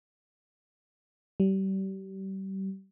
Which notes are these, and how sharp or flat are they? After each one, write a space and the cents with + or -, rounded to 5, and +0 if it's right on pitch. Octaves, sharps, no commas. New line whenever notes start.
G3 -30